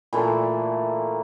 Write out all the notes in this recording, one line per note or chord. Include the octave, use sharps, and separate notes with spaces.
A#2 E3 A3 D4